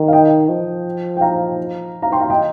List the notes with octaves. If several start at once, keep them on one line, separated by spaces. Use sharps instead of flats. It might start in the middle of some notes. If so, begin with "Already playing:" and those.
Already playing: D#3
F5
D#5 G5
F3
G5
F5 A#5
F5 A#5
G5 C6
F5 A#5
D#5 G5